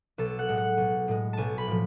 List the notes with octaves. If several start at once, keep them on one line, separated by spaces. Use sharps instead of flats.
B1 A4
F#5
A2 G#3
F#5
B1
A2 G#3
B1 G#5 A5
B5
A2 F3